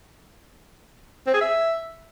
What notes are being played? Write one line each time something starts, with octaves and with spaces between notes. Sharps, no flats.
C4
G#4
E5